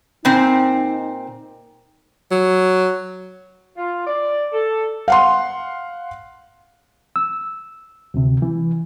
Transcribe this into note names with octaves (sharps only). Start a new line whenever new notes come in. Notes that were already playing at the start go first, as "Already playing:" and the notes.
A#2 C4 D#4
F#3
F4
D5
A4
F5 F#5 C6
E6
D2 C3
E3